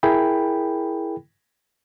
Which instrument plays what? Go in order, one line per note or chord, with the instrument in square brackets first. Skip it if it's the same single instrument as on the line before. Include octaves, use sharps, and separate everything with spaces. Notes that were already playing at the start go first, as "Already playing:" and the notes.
[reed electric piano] E4 G#4 A#4 G5 B5